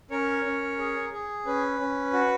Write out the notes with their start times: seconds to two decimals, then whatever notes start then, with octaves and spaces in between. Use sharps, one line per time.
0.11 C#4 A#4 C#5
0.45 C#4
0.78 G#4
1.13 G#4
1.46 C#4 B4
1.80 C#4
2.13 F#4